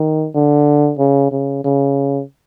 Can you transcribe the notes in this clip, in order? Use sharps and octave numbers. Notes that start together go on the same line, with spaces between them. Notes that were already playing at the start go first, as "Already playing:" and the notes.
Already playing: D#3
D3
C#3
C#3
C#3